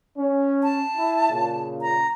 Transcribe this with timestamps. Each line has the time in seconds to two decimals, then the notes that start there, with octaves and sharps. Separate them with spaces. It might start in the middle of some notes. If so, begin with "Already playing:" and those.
0.17 C#4
0.63 A5
0.96 E4
1.30 A#2 C#3
1.82 A#5